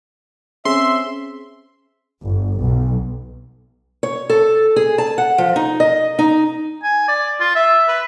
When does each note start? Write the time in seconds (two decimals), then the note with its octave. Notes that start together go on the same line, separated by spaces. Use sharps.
0.65 C4 C#4 G#4 E5 C6
2.22 G1
2.59 B1
4.03 C#5
4.30 A4
4.76 G#4
4.98 A5
5.18 F#5
5.38 F3
5.56 D#4
5.80 D#5
6.19 D#4
6.83 G#5
7.08 D5
7.40 F4
7.55 E5
7.88 B4